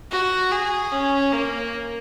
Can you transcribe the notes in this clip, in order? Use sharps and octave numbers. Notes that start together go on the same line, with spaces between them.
F#4
G#4
C#4
A#3